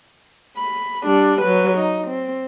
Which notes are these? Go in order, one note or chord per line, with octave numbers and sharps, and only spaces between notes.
B5
G3 D4
F#3 B4
D#4
C4